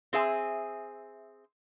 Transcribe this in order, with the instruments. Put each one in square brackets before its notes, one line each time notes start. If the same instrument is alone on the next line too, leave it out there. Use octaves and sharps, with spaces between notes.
[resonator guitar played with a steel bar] C4 G#4 E5 G#5